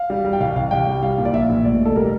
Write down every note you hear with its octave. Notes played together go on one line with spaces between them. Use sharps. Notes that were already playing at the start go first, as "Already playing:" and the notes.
Already playing: F5
G3
G3
G5
C2 F5
C2 F5
C2 G5
G3
G3 F5
A#2
D5
A#1 E5
A#1
F1 D5
F1
A4
G3 A#4